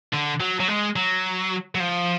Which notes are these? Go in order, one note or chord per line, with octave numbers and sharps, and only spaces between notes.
D3
F#3
F#3
G#3
F#3
F#3
F3